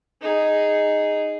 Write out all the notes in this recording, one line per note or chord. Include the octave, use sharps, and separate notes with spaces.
D#4 G#4